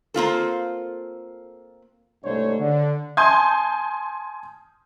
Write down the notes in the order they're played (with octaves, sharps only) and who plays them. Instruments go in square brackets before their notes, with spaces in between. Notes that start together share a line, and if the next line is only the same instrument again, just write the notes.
[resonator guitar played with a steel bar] A#3 C4 F4 A4
[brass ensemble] C2 G#2 A3 D4 C5 C#5
D3
[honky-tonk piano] G#5 A5 C6 D#6 G6 G#6